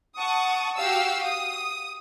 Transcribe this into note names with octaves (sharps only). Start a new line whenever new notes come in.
F#5 A5 C#6 D#6
F#4 G4 F5 E6
D#6